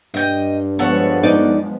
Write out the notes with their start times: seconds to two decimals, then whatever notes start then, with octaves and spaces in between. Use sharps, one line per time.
0.14 G2 D#5 G5
0.79 F3 G#3 B3 A4 C#5 F#5
1.23 D#4 D5